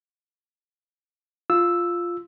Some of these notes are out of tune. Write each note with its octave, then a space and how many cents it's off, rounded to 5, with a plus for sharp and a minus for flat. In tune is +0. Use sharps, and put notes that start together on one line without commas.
F4 +0 E6 +0